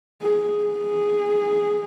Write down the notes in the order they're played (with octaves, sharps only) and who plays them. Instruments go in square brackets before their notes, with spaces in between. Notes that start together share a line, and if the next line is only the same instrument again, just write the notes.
[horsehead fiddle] G#4
G#4